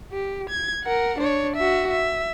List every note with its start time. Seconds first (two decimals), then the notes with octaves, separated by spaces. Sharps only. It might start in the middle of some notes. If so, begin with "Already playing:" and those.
0.12 G4
0.50 G#6
0.84 A#4 F#5
1.19 D4 C#5
1.56 F#4 E5
1.91 E5